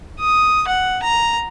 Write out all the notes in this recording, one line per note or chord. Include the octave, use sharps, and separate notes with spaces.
D#6
F#5
A#5